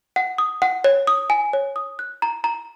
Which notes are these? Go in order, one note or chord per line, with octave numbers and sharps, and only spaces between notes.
F#5
D#6
F#5
C#5
D#6
G#5
C#5
D#6
F#6
A#5
A#5